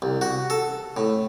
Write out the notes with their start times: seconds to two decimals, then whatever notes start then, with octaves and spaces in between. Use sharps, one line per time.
0.02 C2
0.21 F#4
0.50 A4
0.97 A2